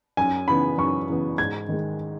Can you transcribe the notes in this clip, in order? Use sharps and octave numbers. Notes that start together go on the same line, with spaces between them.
F#2 G#5
C#3 E3 B3 B5
F#2 C#6
C#3 E3 B3
G#2 G#6
D#3 G#3